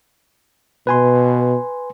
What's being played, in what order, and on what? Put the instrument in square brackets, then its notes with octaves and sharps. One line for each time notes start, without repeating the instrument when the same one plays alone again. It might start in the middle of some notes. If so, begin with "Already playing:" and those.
[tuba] B2 [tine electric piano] B4 G#5 C6